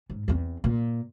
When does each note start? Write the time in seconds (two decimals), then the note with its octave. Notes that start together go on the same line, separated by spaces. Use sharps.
0.10 G#2
0.28 E2 C4
0.64 A#2